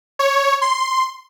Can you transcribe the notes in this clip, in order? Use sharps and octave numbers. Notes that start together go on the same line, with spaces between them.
C#5
C6